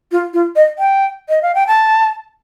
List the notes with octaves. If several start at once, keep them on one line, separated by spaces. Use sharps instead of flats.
F4
F4
D#5
G5
D#5
F5
G5
A5